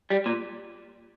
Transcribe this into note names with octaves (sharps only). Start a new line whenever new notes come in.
G3
A#2